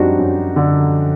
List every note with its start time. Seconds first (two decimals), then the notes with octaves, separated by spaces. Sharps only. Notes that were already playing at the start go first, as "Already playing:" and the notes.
Already playing: F#2 G3 C4 D4 D#4 F#4
0.19 F#2
0.56 D3